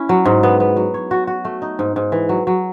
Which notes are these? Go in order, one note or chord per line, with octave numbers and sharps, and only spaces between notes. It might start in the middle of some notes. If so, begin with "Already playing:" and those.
Already playing: C#4 E4
F#3
G#2
B3
B3
F#3
C#5
F#4
F#4
A3
D#4
G#2
G#2
E3
F#3
F#3